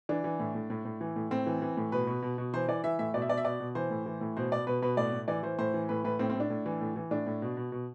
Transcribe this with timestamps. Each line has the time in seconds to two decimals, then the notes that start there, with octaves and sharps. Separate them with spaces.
0.09 E3 D4
0.24 E3
0.40 A2
0.55 A2
0.70 A2
0.85 A2
1.01 E3
1.16 A2
1.31 A2 C4
1.46 E3
1.62 E3
1.77 A2
1.92 B2 B4
2.07 B2
2.22 B2
2.38 B2
2.53 E3 C5
2.68 E3 D5
2.84 E3 E5
2.99 A2 E5
3.14 B2 D5
3.22 E5
3.29 B2 D5
3.37 E5
3.45 B2 D5
3.60 B2
3.75 E3 C5
3.91 A2
4.06 E3
4.21 A2
4.37 B2 C5
4.52 B2 D5
4.67 B2 B4
4.82 B2 B4
4.97 A2 D5
5.13 A2
5.28 E3 D5
5.43 E3 C5
5.59 A2 C5
5.74 E3
5.89 A2 B4
6.04 A2 B4
6.19 A2 C4
6.30 C4
6.35 A2 D4
6.50 A2
6.66 E3
6.81 A2
6.96 E3
7.11 A2 D4
7.26 A2
7.42 B2
7.57 B2
7.72 B2